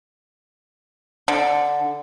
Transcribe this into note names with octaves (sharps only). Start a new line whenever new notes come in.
D3